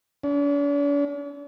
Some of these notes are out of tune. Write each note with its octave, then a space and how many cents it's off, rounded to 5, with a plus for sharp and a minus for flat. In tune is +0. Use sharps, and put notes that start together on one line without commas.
D4 -45